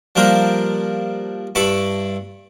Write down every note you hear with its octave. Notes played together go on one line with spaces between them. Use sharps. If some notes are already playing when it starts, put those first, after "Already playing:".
F3 G3 A#3 D4 A#4 C5
G2 E4 A5 B5 C#6 D6